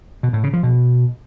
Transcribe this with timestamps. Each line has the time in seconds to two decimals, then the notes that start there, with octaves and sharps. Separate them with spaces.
0.23 B2
0.33 A2
0.43 C#3
0.53 F3
0.63 B2